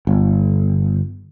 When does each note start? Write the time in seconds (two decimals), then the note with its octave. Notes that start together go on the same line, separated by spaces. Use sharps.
0.07 G1